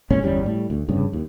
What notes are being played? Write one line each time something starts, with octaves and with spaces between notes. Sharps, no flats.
A1 A#2 G#3 C#4
G1 E2 G3 C#4
A2 G3
D2
F1 G2 C#3
D#2